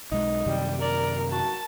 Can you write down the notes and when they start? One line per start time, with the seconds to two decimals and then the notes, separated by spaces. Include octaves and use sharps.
0.12 B1 G#3 D#4
0.46 F#2 C3 D#3 G3
0.82 A#4 D5
1.32 F#4 A5